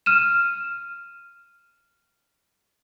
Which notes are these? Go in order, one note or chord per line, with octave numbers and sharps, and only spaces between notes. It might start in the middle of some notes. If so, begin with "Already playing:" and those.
F6 D#7 E7